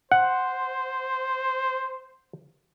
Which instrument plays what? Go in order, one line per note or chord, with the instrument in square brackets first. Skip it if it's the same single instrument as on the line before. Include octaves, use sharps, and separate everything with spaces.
[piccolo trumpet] C5 [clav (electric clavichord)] F#5